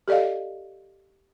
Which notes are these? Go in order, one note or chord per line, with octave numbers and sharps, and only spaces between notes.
G4 A4 D5 D#5 F5